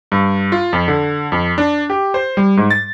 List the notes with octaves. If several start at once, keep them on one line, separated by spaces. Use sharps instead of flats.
G2
F4
F2
D3
F2
D4
G4
C5
G3
G#2
A6